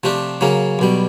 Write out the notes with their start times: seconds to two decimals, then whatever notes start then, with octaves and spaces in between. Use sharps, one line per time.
0.03 C3 F3 A3 D4 G4
0.41 C#3 F#3 A#3 C#4
0.79 B1 B2 G3